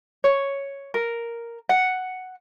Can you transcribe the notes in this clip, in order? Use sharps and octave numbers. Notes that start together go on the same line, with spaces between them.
C#5
A#4
F#5